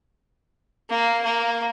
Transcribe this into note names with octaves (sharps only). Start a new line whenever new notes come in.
A#3
A#3